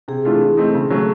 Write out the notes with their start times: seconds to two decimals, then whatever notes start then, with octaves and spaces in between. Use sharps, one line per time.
0.08 C3 G#4
0.25 E3 A3 D4 F4
0.41 E3
0.57 A3 C4 D#4
0.74 C#3
0.91 F#3 A3 C#4